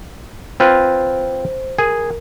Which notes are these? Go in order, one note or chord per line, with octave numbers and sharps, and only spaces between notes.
C4 F4 B4 C5
G#4 A#4